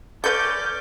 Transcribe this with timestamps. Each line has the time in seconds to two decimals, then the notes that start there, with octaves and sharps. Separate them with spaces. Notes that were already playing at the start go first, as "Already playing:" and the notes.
0.24 C#4 A4 B4 D5 D6 G6